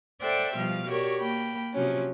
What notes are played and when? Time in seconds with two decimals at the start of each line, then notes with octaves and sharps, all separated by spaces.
0.21 A4 C5 D5 E5 F#5 G5
0.57 B2 F3 G3 F5
0.89 F#4 G4 A#4 C#5 D5
1.20 A#3 G5 B5
1.74 C3 F3 F#3 C#4